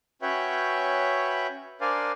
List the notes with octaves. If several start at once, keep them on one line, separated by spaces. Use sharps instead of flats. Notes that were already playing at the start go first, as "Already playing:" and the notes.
C#4 F#4 B4 C#5 E5 G5
D4 A#4 C5 D5 F5 G#5